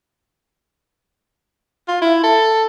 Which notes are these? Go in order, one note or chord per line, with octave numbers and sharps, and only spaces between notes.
F4
E4
A4